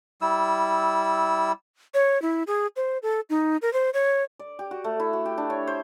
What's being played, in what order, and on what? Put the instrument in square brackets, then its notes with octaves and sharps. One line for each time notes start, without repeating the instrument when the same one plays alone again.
[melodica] G3 E4 E6
[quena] C#5
E4
G#4
C5
A4
D#4
A#4
C5
C#5
[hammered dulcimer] D5
G4
F#4
A3
E4
F#4
G4
D4
C#5
C5